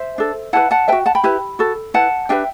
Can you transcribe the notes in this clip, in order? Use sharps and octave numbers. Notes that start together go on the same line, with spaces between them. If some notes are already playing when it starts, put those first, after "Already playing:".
Already playing: C5 E5
D4 A4
E4 G4 B4 F#5 A5
F#5 A5
B4 E5 G5
F#4
F#5 A5
G5 B5
E4 G4 B4
F#4 A4
E4 B4 F#5 A5
D4 G4 B4 E5 G5